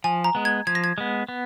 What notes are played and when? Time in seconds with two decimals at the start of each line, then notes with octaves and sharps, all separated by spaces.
0.04 F3 G#5
0.24 A#5
0.35 G#3 B3
0.45 G#6
0.67 F3 G#6
0.75 A#6
0.84 G#6
0.98 G#3 B3
1.29 B3